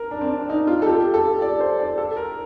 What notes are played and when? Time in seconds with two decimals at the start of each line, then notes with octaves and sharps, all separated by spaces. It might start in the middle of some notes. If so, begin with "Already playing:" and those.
Already playing: A#4
0.11 D4
0.21 C4
0.31 D4
0.49 D#4
0.67 F4
0.82 A4
0.86 G4
1.14 A4
1.42 D5
1.60 C5
1.79 D5
1.98 A4
2.17 A#4